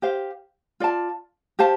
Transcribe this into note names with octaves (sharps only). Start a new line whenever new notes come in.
G4 C5 F5
F4 D5 A5
G4 C5 F5 A5